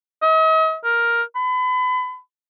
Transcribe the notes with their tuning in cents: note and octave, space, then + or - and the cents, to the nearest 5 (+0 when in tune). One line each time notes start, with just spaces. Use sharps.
D#5 +45
A#4 +10
B5 +35